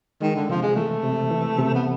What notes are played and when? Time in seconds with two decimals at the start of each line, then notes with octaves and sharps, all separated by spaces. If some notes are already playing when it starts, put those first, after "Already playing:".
0.22 D#3 G#3
0.36 D3
0.49 C3 F3
0.62 G#3
0.76 E3 A3
1.03 C3
1.31 E3
1.58 C3
1.75 B3